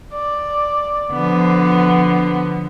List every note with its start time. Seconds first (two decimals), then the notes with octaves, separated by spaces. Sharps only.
0.14 D5
1.12 D3 F3 B3